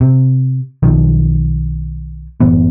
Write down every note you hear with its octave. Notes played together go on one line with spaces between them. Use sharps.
C3
B1 D#3 F3
F#1 A2 E3 B3